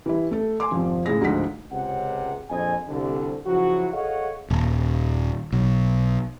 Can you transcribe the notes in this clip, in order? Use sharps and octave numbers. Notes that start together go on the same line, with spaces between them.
E3 G3 E4
A3 A4
G#5 C6 D6
G#1 F2 C3 F3
A2 C#3 G#3 G#4 A#6
D2 G#2 F3 D#4 F#5 B6
C#2 C3 F#5
A#1 F2 D#5 G#5
C2 D3
C#3 F3 F#3 E4 F#4
G#4 A4 C#5 D#5 F5 F#5
D#1
B1